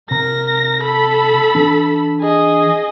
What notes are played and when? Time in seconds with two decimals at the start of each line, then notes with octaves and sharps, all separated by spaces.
0.11 C3 A#4 A#5 A#6
0.82 A4 B5
1.55 E3 D4
2.20 G#4 D#5